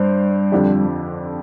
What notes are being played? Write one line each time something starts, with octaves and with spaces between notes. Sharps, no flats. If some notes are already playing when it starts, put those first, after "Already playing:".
Already playing: G2 G3 C4
F2 D3 F3 D4 G4